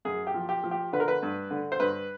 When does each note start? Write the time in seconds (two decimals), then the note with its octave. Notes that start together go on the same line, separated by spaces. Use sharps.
0.05 F#2 G#4
0.27 G4
0.34 F3
0.49 G4
0.64 F3
0.71 G4
0.93 D3 B4
1.00 A#4
1.08 B4
1.23 G2
1.51 D3
1.72 C5
1.80 G2 B4